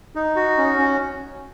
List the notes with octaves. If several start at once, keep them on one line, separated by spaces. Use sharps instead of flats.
D#4
F#4
C#4
C#4